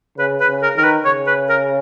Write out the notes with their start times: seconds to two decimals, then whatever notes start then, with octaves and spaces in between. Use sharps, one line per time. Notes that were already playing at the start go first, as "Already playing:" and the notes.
0.18 C#3 B4
0.40 B4
0.47 C#3
0.62 A#4
0.76 D#3 A#4
0.84 B4
1.05 C#3 C#5
1.27 B4
1.49 A#4